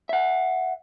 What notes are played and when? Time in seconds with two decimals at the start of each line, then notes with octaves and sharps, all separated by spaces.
0.09 E5 F#5